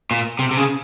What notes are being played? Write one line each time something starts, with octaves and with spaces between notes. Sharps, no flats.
A#2
C3
C3
C#3